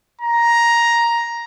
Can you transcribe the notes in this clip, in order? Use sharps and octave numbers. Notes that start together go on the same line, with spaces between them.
A#5